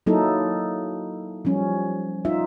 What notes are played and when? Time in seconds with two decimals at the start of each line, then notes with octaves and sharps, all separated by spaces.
0.06 F#3 A#3 D#4 E4 A4
1.45 F3 G3 C#4
2.25 D#4 F4 E5